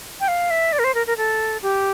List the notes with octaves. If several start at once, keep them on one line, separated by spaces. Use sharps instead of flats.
G5
F5
E5
D5
A#4
C5
A#4
A#4
A4
G4